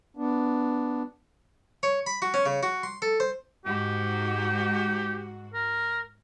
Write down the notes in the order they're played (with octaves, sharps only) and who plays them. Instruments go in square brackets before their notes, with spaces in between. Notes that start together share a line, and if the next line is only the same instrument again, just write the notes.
[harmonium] B3 D4
[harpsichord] C#5
B5
F#4
C#4
C#3
F#4
C6
A4
C5
[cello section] G#2 F#4 [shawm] G4
[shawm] A#4